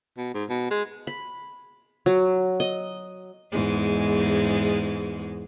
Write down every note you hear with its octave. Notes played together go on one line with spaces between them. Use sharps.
B2
G#2
B2
G#3
B5
F#3
D#5
E2 G#2 G#3